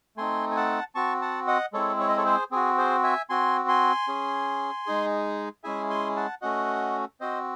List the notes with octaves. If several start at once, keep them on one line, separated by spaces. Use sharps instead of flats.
A3 C4 D#4 G#5 C6
G#5
F#5 A5
C4 F#4 A5 C#6
F#5 A5
D#5 F#5
G#3 C4 E4 A4 C#5
C#5
D#5
A4 C#5
G#4 C5
C4 F#4 G#4
G#4 C5
E5 G#5
C4 F#4 G#5 C6
G#5 C6
C#4 G#4
G#3 D#4 G#4
G#3 C#4 E4 G#4 E5 G#5
G#5 C6
F#5 A5
A3 C#4 F#4 D#5 F#5
C4 F#4 C5 D#5